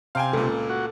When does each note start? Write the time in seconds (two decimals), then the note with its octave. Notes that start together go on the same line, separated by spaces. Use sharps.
0.15 C3 F5 G5 G#5
0.33 C#2 A#2 A4
0.69 F#4